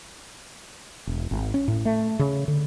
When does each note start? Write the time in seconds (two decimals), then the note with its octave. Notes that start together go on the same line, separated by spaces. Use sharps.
1.07 E1
1.31 G#1
1.54 C#4
1.68 A2
1.85 A3
2.19 C#3
2.48 D3